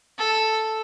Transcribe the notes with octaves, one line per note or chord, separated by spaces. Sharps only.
A4